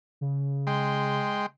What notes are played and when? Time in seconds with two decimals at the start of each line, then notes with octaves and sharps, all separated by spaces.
0.21 C#3
0.67 G#3 G5 C6